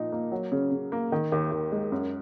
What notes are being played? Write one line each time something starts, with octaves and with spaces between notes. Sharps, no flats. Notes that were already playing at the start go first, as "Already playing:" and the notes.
Already playing: A#2 F3 D#4
A#3
F#3
C#3
C#3
A#3
D#3
D#2
D#2
G#3
F#2